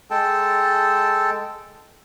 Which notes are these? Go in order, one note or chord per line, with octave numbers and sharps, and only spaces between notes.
G#3 A4 G5 A5